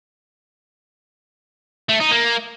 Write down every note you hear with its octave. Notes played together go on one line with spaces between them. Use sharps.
A3
D#4
A#3